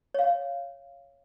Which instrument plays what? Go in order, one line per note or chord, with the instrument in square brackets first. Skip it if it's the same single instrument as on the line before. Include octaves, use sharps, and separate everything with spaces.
[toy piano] C#5 F5